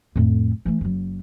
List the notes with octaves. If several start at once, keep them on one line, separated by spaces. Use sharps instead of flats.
F2 A2
E3 A3
F#1 F#3